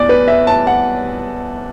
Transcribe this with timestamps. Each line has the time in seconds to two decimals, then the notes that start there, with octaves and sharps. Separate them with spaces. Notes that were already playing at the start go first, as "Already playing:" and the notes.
Already playing: E2 D5 D6
0.09 B4
0.28 E5
0.47 A5
0.67 F#5